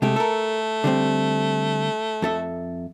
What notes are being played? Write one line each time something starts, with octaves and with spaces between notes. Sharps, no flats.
C3 G#3 A3 G4
A4 A#4
D3 G3 C4
F2 A4 E5